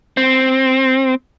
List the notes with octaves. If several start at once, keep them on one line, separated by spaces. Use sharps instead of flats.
C4